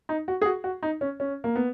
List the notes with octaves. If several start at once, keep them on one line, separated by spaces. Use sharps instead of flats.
D#4
F#4
G#4
F#4
F#4
D#4
C#4
C#4
A#3
B3